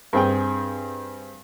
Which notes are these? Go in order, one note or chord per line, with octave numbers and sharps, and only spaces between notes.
G2 C4 G#4 G5